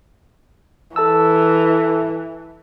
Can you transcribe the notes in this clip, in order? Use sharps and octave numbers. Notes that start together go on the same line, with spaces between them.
E3 A4 A5 E6